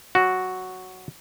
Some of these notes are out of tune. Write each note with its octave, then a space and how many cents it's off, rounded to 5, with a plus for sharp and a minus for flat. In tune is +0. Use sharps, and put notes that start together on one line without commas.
F#3 +0 F#4 +0